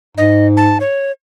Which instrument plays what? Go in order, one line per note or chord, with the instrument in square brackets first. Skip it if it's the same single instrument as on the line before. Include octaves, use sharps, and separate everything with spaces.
[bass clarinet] G#2 [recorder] D#5
[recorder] A5
C#5